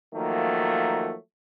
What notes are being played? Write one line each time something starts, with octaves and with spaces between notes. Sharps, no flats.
D#3 F3 F#3 A3 A#3